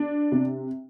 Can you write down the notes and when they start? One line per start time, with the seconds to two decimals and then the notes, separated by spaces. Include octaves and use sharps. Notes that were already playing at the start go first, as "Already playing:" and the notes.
Already playing: D4
0.32 C3